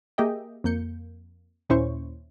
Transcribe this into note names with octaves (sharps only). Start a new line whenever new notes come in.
A#3 G4 G#4 D#5 E5 G5
F2 A#3 G6 C#7
D#2 A#2 C#4 E4 C5 C#6